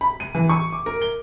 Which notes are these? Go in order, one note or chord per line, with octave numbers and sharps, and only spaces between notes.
B5
D#7
E3
C#6
D6
A#4
G7